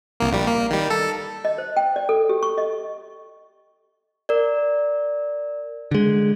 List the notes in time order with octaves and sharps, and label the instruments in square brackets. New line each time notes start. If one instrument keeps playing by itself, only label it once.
[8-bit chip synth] C2 A#3
A#1 G3
A#3
D#3 G3
A4
[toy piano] D#5
C5
G5
D5
A4
G4
C#6
D#5
[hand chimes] A#4 D5
[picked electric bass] D3 G#3